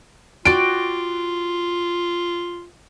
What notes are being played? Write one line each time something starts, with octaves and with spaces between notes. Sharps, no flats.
F4 F#4 D5 G5 D7